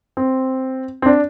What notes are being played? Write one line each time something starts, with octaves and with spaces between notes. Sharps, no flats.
C4
C4
D4